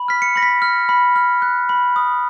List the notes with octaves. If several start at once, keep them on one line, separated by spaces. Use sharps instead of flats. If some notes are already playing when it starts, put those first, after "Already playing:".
Already playing: B5
F6 B6
C#7
B5 A#6
B6
F6
B5
F6
F#6
B5
D#6